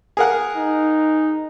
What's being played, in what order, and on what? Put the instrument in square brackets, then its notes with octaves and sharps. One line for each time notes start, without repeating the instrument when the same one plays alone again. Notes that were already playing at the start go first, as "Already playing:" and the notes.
[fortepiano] G#4 A#4 F#5
[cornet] D#4